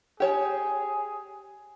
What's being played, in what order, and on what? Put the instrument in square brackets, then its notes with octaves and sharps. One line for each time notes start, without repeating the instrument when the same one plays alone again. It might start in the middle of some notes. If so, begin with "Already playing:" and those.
[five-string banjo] G4 C#5 A5 [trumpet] G#4